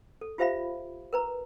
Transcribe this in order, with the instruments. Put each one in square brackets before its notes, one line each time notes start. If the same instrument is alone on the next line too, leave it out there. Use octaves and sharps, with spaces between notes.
[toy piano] A4
F4 G4 C5 E5 F5 B5
A#4 B4 A#5